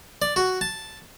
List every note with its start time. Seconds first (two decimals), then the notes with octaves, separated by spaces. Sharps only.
0.22 D5
0.36 F#4
0.61 A5